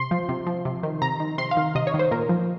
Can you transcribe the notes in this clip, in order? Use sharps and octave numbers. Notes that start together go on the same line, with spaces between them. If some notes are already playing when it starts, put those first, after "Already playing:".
Already playing: C3 C6
F3
C3
F3
C3
D#3
C3 A#5
D#3
C3 C6
F5
D#3
C3 D#5
C#5
D#3
C5
A#2 A#4
F3